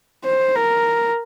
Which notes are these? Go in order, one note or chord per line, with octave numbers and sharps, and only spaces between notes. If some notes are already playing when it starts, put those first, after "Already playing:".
C5
A#4